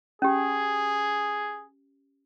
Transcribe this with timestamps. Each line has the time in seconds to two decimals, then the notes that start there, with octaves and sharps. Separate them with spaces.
0.22 C#4 G4 G#4